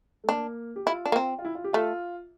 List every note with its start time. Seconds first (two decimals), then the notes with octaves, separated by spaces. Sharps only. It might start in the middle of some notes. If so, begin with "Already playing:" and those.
0.24 A3
0.29 A#3 D4
0.76 G4
0.86 E4 F4
1.05 D4
1.12 A#3
1.16 C4
1.39 F4
1.45 E4
1.55 F4
1.64 G4
1.73 A3 F4